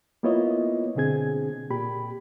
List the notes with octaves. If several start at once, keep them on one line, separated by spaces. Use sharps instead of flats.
A#3 B3 E4 F4 C#5 D#5
B2 D3 C4 G#4 G#6
A#2 G4 B5